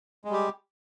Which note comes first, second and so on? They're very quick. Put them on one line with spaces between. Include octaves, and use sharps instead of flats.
G#3 G3 G4